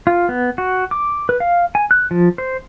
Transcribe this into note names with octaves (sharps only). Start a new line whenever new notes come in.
F4
B3
F#4
D6
B4
F5
G#5
F#6
F3
C5